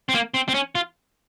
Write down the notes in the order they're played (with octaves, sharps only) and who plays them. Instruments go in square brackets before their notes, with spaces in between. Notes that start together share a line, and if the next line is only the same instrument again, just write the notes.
[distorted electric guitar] C4
A#3
C4
C4
C#4
F4